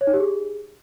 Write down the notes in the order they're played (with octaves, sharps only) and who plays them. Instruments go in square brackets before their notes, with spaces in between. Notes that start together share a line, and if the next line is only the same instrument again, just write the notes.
[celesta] C#5
D#4
G4
G#4